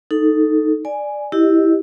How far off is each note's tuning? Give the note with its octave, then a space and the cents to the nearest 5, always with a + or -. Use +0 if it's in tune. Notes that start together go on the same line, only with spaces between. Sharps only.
D#4 +0 A4 +0
D5 +10 G#5 +0
E4 -10 G4 +0 D#5 +0